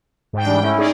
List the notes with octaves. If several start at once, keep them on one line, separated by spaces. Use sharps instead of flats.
G#2 G5
E3 G3 D4
A3 C#4 E4
D#4 G#4 D5